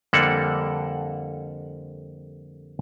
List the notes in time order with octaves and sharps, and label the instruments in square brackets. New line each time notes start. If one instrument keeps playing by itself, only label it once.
[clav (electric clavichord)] F2 D3 G3 A#3 A4 F#5